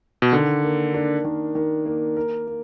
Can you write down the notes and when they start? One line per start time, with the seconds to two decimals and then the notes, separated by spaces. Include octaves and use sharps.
0.22 B2
0.32 D3 D#3
0.63 A#3
0.94 D4
1.24 D#3
1.55 D#3
1.85 A#3
2.17 A#4
2.47 A#3